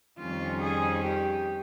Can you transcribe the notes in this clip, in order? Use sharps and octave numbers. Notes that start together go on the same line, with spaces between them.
F2 D#3 G3 C#4 F4
G#4
G4